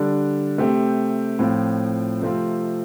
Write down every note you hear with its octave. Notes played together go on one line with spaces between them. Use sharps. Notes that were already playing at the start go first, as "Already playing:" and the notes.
Already playing: D3 G3 D4
C3 A3 C4 G4
A2 F3 C4 F4
C3 F3 A3 C4 F4